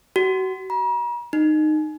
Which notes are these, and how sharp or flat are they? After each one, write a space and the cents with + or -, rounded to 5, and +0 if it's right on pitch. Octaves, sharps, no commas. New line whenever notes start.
F#4 +30
A#5 +45
D#4 -15